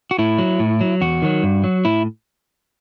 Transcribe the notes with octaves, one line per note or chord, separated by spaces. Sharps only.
F#4
A2 E4
F#3
A2
F#3
E2 F#4
D#3 F#3
G2
F#3
A2 E4